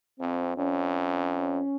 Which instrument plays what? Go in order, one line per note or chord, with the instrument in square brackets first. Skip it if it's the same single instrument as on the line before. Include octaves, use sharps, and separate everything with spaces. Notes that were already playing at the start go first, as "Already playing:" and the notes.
[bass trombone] F2 [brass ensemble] C4
[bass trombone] F2 [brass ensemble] C#4